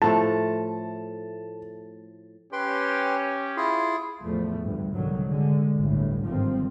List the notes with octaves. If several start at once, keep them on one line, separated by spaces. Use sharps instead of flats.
A2 F3 A3 A5
C#4 G4 B4 G5 C6
E4 F4 G#4
A1 E2 F3 A3
D2 G2
C2 G#2 D3 D#3 F#3
D3 G#3
G1 D2 A2
G1 G#2 D#3 F3 C4